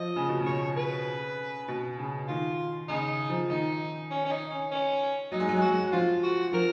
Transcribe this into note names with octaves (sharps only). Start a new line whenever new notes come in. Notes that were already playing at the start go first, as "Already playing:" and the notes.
Already playing: F3 D#5
C#3
B2
C#3
C#5
B4
B2
C#3
D#3 F4
C#3 D#4
F3
D#3 D#4
C#4
C#4
D#4
C#4
C#4
F#3 D#4
G#3
F#3
G#3
F#3 F#4
F3 F4
F#4
F3 A#4